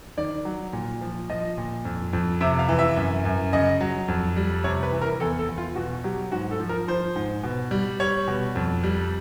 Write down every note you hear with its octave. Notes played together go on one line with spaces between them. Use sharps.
D#3 D5
F#3
A#2
F3
F3 D#5
A#2
F2
F2
C3 E5
F5
E3
E5
F#2
F#2
C#3 D#5
F#3
F2
G3
C3 C#5
B4
E3
A#4
E2 A4
A4
E2
F4
B2 F#4
F#3 G4
G#2 F#4
A4
F3
A#4
F3 C5
G#2
B2
G3
G3 C#5
B2
F2
G3